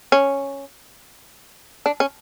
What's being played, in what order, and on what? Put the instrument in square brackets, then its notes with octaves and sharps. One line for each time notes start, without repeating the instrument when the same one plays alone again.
[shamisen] C#4
D4
C#4